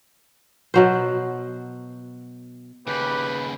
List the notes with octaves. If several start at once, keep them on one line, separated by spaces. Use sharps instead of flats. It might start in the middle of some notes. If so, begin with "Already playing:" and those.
B2 F#3 C5
D#2 C#3 G4 B4 B5